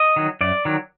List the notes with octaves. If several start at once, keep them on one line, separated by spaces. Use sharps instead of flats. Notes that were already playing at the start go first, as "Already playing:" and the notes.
Already playing: D#5
D#3 F#3
F#2 D5
D#3 F#3